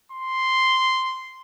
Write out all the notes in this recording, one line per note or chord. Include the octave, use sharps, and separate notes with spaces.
C6